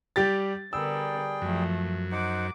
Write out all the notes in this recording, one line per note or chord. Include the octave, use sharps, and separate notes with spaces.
G3 G4 A6
D3 G3 B3 G#4 A#4 G5 E6
F#2 F3 A3
D#4 C5 F#5 D6